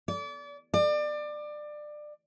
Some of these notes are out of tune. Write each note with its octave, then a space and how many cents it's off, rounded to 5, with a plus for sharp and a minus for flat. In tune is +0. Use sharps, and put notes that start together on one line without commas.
D5 -35
D5 +25